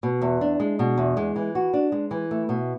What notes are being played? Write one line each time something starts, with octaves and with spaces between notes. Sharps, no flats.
B2
E2
D4
G#3
B2
E2
G#3
E3
F#4
D4
G#3
E3
A3
B2